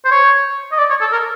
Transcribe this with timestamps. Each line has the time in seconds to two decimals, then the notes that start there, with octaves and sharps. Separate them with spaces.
0.05 C5
0.11 C#5
0.72 D#5
0.78 D5
0.90 C#5
1.00 A4
1.12 A#4